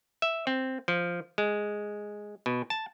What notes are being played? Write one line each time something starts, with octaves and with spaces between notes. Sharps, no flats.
E5
C4
F3
G#3
B2
A5